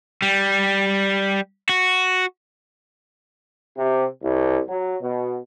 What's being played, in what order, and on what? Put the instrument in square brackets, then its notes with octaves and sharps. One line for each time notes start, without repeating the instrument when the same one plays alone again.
[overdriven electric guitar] G3
F#4
[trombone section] C3
C2
F#3
B2